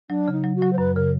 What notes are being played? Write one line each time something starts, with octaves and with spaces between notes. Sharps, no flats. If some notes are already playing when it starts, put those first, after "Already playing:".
F#3 D4
C#3 D#4
F#3
F#4
F#3
C5
F#2 B4
C#3 A#4